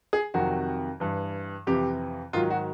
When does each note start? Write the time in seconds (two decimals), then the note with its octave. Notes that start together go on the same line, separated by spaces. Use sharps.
0.13 G#4
0.34 F2 C3 D#3 F#3 F#4
1.00 G2 E3
1.67 F2 C3 E3 G4
2.33 G#2 D#3 F#3 F4
2.50 F#4